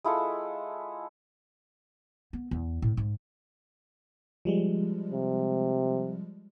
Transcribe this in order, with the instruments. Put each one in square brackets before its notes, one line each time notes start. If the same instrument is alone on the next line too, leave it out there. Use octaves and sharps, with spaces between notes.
[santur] G#3 E4 F4 A4
[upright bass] B3
E2
A2
G#2
[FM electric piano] F3 G3 G#3
[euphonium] C3